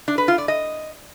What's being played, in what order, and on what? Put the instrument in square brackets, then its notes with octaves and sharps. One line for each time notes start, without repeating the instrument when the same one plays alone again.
[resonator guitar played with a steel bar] D4
B4
F4
D5
D#5